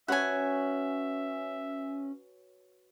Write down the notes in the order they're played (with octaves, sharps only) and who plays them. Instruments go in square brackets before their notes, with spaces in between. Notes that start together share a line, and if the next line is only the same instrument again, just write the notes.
[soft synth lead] C#4 [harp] F#4 B4 C#5 [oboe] E5 [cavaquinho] F#5 G#5